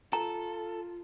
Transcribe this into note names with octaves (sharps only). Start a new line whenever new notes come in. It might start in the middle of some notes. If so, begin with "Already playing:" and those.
F4 A4 A#5